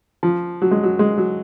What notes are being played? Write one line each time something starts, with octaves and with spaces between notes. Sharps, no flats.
F3
F#3
G#3
F#3
G#3
F#3